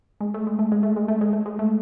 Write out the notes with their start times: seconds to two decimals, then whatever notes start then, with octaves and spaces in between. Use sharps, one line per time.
0.21 G#3
0.34 A3
0.47 G#3
0.59 A3
0.72 G#3
0.83 A3
0.96 G#3
1.08 A3
1.21 G#3
1.33 A3
1.46 G#3
1.59 A3